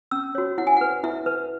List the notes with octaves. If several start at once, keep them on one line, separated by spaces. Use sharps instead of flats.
C#4 E6
F#4 C#5
E4 F#5
G#5
B4 F#5
E4 E5
B4